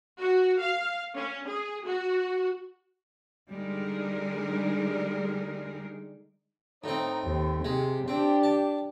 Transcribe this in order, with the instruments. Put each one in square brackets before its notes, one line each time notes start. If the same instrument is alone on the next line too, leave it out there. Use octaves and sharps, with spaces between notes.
[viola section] F#4
F5
C#4
G#4
F#4
[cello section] D3 G3 G#3 D#4 G#4 A#4
[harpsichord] A2 C4 [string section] D#4
[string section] D#2
[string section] C3 [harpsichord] G#3
[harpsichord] C4 [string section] D4 G4
[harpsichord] A5